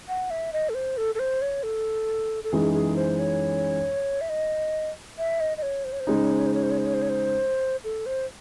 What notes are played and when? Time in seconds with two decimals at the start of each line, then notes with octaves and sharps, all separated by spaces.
0.08 F#5
0.30 E5
0.53 D#5
0.69 A4
0.75 C5
0.97 A4
1.15 A4
1.19 C5
1.42 C#5
1.63 A4
2.44 A4
2.52 F#2 E3 G#3 D#4 G#4
2.74 G#4
2.96 C5
3.19 C#5
4.21 E5
4.29 D#5
5.18 E5
5.40 D#5
5.57 D#5
5.62 C#5
5.85 C5
5.93 C#5
6.00 C5
6.07 C#3 G#3 D#4 C#5
6.15 C5
6.24 C#5
6.32 C5
6.39 C#5
6.46 C5
6.54 C#5
6.63 C5
6.71 C#5
6.78 C5
6.86 C#5
6.94 C5
7.02 C#5
7.09 C5
7.84 A4
8.06 C5